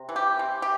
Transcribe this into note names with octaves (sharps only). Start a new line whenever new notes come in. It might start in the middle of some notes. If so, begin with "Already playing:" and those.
Already playing: C3
E3
G4
C3
G4